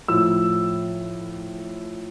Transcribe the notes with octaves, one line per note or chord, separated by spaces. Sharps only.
A2 F3 E6